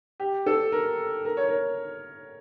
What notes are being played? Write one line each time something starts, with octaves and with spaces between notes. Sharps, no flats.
G4
A4
A#4
A#4
C#5
A#4